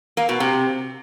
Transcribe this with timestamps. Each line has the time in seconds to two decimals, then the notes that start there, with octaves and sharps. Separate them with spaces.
0.17 A#3
0.29 B2
0.40 C3